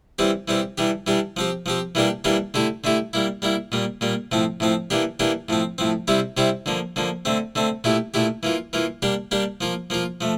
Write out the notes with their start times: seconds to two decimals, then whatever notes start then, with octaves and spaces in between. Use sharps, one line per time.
0.19 E3 G3 C4 G4
0.48 E3 G3 C4 G4
0.78 E3 G3 D4 G4
1.07 E3 G3 D4 G4
1.37 F3 C4 G4
1.66 F3 C4 G4
1.95 E3 G3 A#3 D4 G4
2.24 E3 G3 A#3 D4 G4
2.54 D3 A3 E4 G4
2.84 D3 A3 E4 G4
3.13 G3 A#3 E4
3.42 G3 A#3 E4
3.72 A#2 G3 A#3
4.01 A#2 G3 A#3
4.32 A2 F3 C4
4.60 A2 F3 C4
4.90 E3 A#3 D4 G4
5.19 E3 A#3 D4 G4
5.49 A2 F3 C4
5.78 A2 F3 C4
6.08 C3 G3 C4 E4 G4
6.37 C3 G3 C4 E4 G4
6.66 D3 F3 A#3
6.96 D3 F3 A#3
7.25 D3 A3 C4
7.55 D3 A3 C4
7.84 A#2 A3 E4 G4
8.14 A#2 A3 E4 G4
8.43 E3 A#3 F4
8.73 E3 A#3 F4
9.02 G3 A#3 D4 G4
9.31 G3 A#3 D4 G4
9.61 F3 A#3 F4
9.90 F3 A#3 F4
10.21 F3 A3